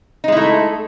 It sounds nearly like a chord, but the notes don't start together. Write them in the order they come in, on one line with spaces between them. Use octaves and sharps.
D#4 G#3 E4 A3 A4